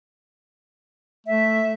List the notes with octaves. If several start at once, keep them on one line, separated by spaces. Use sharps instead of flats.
A3 E5